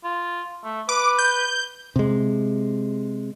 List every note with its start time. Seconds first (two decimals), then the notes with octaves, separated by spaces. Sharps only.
0.04 F4
0.64 A3
0.89 B4 D6
1.19 G6
1.96 C3 G#3